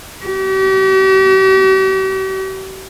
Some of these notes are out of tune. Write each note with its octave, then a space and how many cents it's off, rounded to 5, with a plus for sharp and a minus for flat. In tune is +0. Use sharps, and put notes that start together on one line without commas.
G4 -45